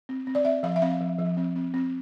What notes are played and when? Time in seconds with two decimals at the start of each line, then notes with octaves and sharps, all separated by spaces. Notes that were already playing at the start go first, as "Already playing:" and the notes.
0.09 C4
0.27 C4
0.35 D5
0.45 C4 E5
0.63 F3 F5
0.76 E5
0.82 C4 F5
1.01 F3
1.18 F3
1.37 C4
1.56 C4
1.74 C4